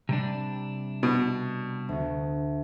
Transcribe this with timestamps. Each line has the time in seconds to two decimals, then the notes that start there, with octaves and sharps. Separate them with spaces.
0.09 C3 G3 D4
1.03 B2
1.89 D2